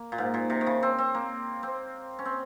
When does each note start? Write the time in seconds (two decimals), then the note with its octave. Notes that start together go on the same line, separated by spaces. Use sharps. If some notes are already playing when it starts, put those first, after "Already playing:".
Already playing: A#3
0.12 A#2
0.18 G#2
0.34 A#2
0.50 C3
0.61 D#3
0.67 C#3
0.83 C4
0.99 C4
1.15 A#3
1.63 C4
2.19 C#4
2.25 C4